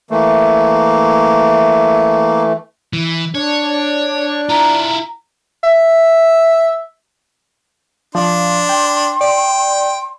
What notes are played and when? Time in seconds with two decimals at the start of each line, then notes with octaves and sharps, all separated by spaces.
0.11 E3 A3 A#3
2.93 E3
3.35 D4 C#5
4.49 E4 F4 A#5
5.63 E5
8.15 F3 D4 C6
8.69 G5
9.21 D5 G5